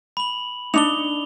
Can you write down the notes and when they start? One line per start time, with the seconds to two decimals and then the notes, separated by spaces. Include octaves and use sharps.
0.17 B5 F#7
0.74 D4 D#4 F7 G7